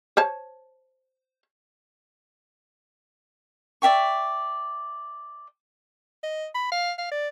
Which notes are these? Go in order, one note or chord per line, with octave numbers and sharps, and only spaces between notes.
C5 C#5 A5
D5 E5 G5 C#6
D#5
B5
F5
F5
D5